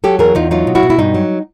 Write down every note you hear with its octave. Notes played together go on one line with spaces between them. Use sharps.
F#3 G4 A4
E2 G#4 A#4
E2 D#4 F4
F#3 D#4 F4
B2
E4 F#4
B2
E4
G2 D#4
F#3